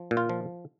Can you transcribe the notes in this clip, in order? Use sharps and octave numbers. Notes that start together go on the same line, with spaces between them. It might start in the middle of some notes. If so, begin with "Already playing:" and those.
Already playing: F3
A#2
F4
F3